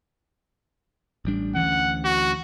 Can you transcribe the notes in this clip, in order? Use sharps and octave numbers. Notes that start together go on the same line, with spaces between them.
A1 G3 D4
D2 E3 C#4 F#5
F#4